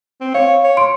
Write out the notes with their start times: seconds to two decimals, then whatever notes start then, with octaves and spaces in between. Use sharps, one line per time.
0.21 C4
0.34 C#5 F5
0.64 C#5
0.77 C6 D7